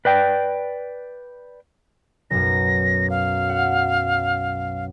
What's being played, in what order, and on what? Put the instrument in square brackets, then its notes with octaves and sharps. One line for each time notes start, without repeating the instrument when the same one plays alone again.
[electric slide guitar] B4 D5 G5
[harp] B1 F#2 [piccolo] A#6
[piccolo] F5
[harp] F#5